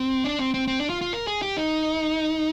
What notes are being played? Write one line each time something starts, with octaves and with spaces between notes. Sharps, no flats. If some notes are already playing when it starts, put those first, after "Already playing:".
Already playing: C4
D4
C4
C4
C4
D4
F4
F4
A#4
G#4
G4
D#4